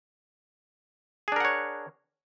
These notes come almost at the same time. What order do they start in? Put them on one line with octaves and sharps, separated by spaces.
G#4 D4 A#4 F#5 C#5